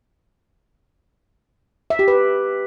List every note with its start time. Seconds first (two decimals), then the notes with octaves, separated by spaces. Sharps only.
1.90 E5
1.99 G4
2.08 B4